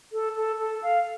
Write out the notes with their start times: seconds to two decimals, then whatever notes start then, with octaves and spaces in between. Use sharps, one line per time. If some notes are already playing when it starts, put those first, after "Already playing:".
0.13 A4
0.36 A4
0.59 A4
0.83 F5